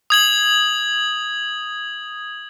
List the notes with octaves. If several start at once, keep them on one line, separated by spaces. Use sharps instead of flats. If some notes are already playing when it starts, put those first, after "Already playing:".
D#6 G#6 F#7